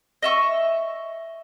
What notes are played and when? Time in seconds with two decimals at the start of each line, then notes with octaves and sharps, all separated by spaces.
0.22 D#5 E5 C#6